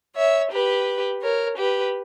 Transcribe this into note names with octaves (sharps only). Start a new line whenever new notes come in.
C#5 E5
G4 B4
A#4 C#5
G4 B4